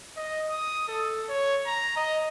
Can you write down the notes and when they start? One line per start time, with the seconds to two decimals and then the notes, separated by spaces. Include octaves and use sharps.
0.17 D#5
0.50 D#6
0.88 A4
1.29 C#5
1.66 A#5
1.96 D#5